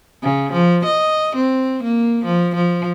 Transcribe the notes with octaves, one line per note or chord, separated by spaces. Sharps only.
C#3
F3
D#5
C4
A#3
F3
F3